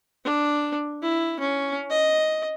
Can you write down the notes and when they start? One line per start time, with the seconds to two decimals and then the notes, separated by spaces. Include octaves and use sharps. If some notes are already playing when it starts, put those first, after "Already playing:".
0.24 D4
1.02 E4
1.39 C#4
1.90 D#5